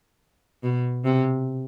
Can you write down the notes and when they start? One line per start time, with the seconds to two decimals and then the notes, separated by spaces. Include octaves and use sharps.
0.63 B2
1.04 C3